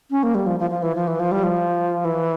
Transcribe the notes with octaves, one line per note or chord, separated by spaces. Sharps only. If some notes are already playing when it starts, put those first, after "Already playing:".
C#4
A#3
G3
F3
F3
F3
E3
F3
E3
F3
G3
F3
E3